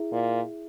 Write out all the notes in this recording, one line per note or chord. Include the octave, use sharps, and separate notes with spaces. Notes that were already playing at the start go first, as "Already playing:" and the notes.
Already playing: E4 G#4 E5
A#2